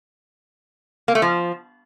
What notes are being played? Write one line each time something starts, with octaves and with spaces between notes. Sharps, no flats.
A#3
A3
F3